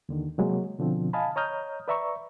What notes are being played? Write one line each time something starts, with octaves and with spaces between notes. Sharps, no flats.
D#2 D3 D#3
C3 F#3 G#3 A#3
B2 D3 F3 C4
D#5 F5 G#5 A5 B5
C#5 D#5 A#5 D#6 F6 G6
B4 D5 E5 A#5 C#6